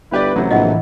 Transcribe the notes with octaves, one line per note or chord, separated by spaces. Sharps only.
G1 E4 G4 B4 D5
A1 C3 F#3
A#1 A2 E3 D#5 F#5